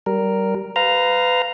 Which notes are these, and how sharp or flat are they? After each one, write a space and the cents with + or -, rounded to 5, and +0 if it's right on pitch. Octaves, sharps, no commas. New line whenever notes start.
G3 -25 A#4 +0
B4 +30 F5 +0 A#5 +0